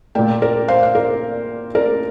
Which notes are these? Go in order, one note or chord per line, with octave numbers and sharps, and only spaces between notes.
A#2 A#3 D5 G5
A#4 D5
C5 F5
F5
A#4 D5
A#4 D5